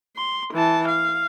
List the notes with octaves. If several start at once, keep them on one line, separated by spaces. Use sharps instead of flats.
C6
E3 A5
F5